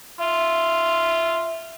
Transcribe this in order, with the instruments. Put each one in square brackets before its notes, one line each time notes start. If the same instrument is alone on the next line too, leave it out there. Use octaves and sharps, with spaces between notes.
[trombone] F4 [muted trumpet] E5